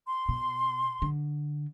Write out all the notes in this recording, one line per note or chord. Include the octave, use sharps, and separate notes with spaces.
C6
B2
D3